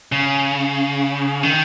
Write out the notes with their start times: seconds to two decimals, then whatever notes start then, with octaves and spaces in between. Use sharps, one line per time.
0.12 C#3
1.43 D#3